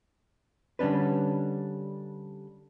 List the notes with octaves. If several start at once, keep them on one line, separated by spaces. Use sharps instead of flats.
D3 G3 C#4 D4 B4